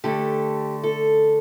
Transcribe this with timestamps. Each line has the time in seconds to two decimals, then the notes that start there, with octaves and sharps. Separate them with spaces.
0.04 D3 A3 G4
0.83 A4